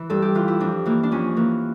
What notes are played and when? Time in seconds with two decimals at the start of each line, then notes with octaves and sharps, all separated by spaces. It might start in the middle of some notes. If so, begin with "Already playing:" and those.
Already playing: E3
0.10 G2 A4
0.22 G4
0.35 E3 F4
0.48 E4
0.60 F2 D4
0.86 E3 A#3
1.03 D4
1.11 F2 C#4
1.37 E3 A#3